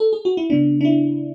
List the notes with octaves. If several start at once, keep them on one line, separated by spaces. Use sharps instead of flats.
A4
G#4
F#4
E4
C#3 G#3 B3 D4
D4
E4